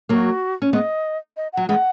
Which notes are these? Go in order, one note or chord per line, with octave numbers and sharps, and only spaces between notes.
F#3 A#3 F#4 A#4
C#4
G#3 B3 D#5
D#5
F#3 F#5
E3 G#3 F#5